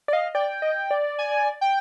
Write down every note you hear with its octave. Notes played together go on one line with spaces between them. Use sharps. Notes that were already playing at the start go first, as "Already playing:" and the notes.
D5
D#5 F5
D5 G5
D#5
D5
G#5
G5